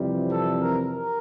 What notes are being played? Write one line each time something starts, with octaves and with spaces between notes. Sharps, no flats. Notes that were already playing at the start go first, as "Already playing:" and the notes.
Already playing: F2 C3 E3 G3
A4
A#4
A#4